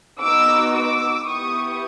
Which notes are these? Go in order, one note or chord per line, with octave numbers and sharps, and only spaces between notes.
B3 D#4 F#4 D6 E6
D6 E6
B3 E4 G4 C#6 D#6